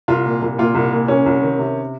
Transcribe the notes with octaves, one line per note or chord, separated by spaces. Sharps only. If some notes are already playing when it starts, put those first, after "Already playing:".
C2 F4
A#2
C2
A#2 F4
C2
A#2
C2 C#4
C2
D#3
C3